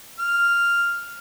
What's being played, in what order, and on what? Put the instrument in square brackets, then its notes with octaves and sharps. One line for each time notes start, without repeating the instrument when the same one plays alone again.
[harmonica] F6